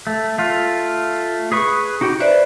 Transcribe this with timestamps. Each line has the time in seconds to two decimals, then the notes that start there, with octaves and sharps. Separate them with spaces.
0.07 A3
0.38 A3 F4
1.52 G#4 B4 C#6
2.01 D#4 F#4 G4
2.20 B4 C5 D5 E5